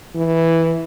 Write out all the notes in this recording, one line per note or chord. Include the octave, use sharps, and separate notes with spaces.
E3